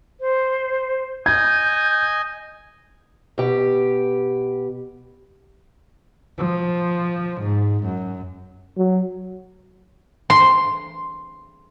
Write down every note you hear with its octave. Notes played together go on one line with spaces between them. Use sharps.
C5
D#5 G#5 D#6 G6 G#6
B2 G4
F3
G#2
F#2
F#3
C6